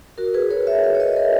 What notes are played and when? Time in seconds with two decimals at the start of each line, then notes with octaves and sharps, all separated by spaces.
0.18 F#4 A#4
0.34 G#4 B4
0.51 A#4 C#5
0.67 C#5 E5
0.84 C#5 E5
0.95 C#5
1.00 B4 D#5
1.16 A#4 C#5